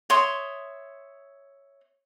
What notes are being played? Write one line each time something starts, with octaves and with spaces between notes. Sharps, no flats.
C#5 E5 C6 D#6